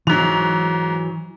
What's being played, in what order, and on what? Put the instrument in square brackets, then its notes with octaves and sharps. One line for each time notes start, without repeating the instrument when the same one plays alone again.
[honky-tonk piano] G#2 F7 [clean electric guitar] E3 F#3